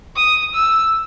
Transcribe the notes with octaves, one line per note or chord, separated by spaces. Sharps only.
D#6
E6